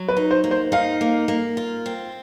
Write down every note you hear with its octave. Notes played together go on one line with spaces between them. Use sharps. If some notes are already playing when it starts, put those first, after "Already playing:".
Already playing: F#3
B4
D#4
C5
A#3
C5
D#4 F5
A#3
A#3
F4
C4